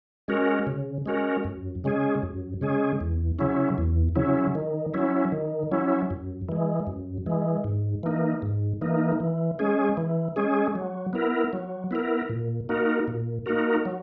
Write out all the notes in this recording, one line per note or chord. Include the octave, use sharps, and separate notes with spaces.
G#3 C#4 F#4 A#4
C#3
G#3 C#4 F#4 A#4
F#2
C#3 G#3 C#4 G#4
F#2
C#3 G#3 C#4 G#4
E2
C#3 F#3 C#4 E4
E2
C#3 F#3 C#4 E4
D#3
F#3 C#4 E4
D#3
F#3 C#4 E4
F#2
E3 G#3
F#2
E3 G#3
G#2
E3 A#3 D#4
G#2
E3 A#3 D#4
E3
G#3 C#4 G#4
E3
G#3 C#4 G#4
F#3
B3 E4 A#4
F#3
B3 E4 A#4
A#2
A#3 D#4 F#4 A#4
A#2
A#3 D#4 F#4 A#4
F#3